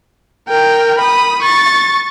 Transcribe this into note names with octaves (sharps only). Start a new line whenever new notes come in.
A#4 G5
B5 D#6
C#6 A6